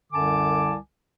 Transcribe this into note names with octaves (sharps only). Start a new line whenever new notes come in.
C2 F#2 D3 G#5 A5 D6